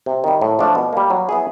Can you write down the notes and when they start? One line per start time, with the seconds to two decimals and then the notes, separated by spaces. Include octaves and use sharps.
0.06 C3
0.24 D#3 G3
0.41 A2
0.59 F3 A3 D4
0.75 B2
0.93 G3 A#3
1.10 F#3
1.29 B3 E4 G#4